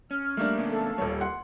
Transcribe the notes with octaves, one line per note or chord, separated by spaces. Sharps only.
C#4 F6
G3 A3 A#3 D4
C#3 B3 C#4
A4 F5
D#1 G3 C#5
F#5 C6